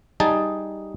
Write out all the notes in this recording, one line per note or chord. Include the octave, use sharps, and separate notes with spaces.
G3 D#4 G#4 A5